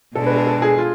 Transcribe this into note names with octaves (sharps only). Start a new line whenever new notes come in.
B2 G#3 D4 A4
B4
A4
A4
G#4
F4